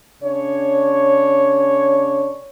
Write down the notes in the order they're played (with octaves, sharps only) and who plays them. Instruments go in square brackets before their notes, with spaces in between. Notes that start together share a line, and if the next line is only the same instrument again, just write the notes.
[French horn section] C#3 D4 C#5